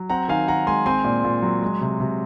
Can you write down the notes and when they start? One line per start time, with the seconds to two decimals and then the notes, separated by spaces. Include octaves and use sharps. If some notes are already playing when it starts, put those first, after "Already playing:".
Already playing: F#3
0.10 C4 F#5 A#5
0.28 D#3 F5 G#5
0.48 D#3 F#5 A#5
0.67 G#3 G#5 C6
0.86 C4 G#5 C6
1.04 A#2
1.24 A#2
1.42 F#3
1.62 G#3
1.81 C3
2.00 C3